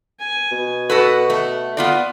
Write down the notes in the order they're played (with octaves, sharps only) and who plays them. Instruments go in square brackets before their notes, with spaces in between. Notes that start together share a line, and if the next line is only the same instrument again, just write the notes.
[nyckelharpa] G#5
[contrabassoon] B2
[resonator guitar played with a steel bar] F#4 A4 B4 [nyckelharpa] F#5
[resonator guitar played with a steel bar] A3
B3 F4 D5